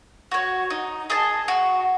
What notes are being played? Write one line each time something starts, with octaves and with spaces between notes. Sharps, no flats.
F#4 C#5
D#4
G#4 D#5 A5
F#4